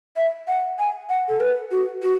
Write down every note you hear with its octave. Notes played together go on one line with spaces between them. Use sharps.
E5
F#5
G#5
F#5
A4
B4
F#4
F#4